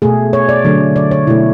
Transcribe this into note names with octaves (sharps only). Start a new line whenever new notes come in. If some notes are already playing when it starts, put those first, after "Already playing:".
B2 A3 G#4
C#5
D5
D3 F#3 A3
D5
C#5
B2 A3 E4